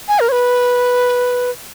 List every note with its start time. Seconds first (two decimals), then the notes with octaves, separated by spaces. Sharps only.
0.08 G#5
0.20 A#4
0.29 C#5
0.32 B4